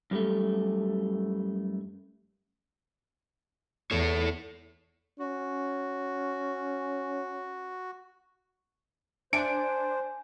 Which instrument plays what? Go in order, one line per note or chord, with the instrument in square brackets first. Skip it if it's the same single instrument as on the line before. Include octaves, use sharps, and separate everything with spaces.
[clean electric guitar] F#2 G3 A3
[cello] E2 [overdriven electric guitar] A4 C#5
[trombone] C#4 [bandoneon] F#4
[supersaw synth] D4 [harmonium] C5 [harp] G#5 [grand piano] D7